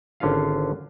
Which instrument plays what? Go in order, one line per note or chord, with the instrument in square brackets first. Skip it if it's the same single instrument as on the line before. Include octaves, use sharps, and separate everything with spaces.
[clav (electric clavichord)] G#1 D3 C#4 F4 F5